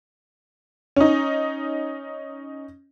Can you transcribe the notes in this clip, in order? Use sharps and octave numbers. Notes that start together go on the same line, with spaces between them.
C#4 D#4